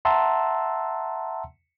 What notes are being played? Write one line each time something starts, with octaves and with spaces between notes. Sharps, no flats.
E5 F#5 A5 A#5 C6 E6